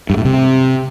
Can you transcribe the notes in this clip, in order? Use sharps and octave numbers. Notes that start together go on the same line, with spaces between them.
G2
A2
C3